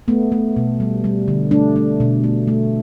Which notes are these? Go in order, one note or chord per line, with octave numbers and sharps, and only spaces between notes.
A3 B3
A3
B2
G3
G3
D3
A3 D4
A3
B2
A3
A3